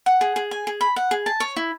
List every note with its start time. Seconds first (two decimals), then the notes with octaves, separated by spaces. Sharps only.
0.06 F#5
0.21 G#4
0.36 G#4
0.51 G#5
0.67 G#4
0.81 B5
0.96 F#5
1.11 G#4
1.26 A5
1.40 C#5
1.56 E4